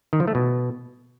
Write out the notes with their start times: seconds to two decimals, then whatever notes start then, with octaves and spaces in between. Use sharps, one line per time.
0.13 D#3
0.20 F3
0.27 A3
0.35 B2